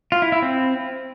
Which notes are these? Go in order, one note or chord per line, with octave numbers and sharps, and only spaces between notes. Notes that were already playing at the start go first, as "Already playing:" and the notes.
F4
E4
E4
C4